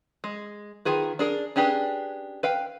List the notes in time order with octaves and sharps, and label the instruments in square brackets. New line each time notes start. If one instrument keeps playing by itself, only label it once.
[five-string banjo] G#3
D#3 F4 G#4 B4
D4 G#4 A#4
C#4 D4 G4 G#4 B4
B4 F5 G5